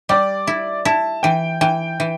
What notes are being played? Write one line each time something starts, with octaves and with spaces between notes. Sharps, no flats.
G3 D5
E4
E4 A5
E3 G5
E3 G5
E3